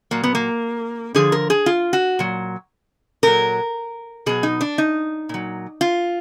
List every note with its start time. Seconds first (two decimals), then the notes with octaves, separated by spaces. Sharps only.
0.11 A#2 F#3 A#3
0.24 B3
0.35 A#3
1.15 D3 F3 G#4
1.32 A#4
1.50 G#4
1.66 F4
1.93 F#4
2.19 A#2 F#3
3.23 A#2 F#3 A#4
4.26 B2 F#3 G#4
4.43 D#4
4.61 D4
4.78 D#4
5.29 A#2 F#3
5.81 F4